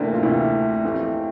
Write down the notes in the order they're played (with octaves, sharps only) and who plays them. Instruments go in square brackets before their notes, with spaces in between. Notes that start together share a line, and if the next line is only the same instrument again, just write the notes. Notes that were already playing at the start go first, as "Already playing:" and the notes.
Already playing: [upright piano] D2 C3 E3 A3 [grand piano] A#3 C4 D4
[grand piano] F4
[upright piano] D2 C3 E3 A3 [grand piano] E4
[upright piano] F2 E3 A3 C4 G4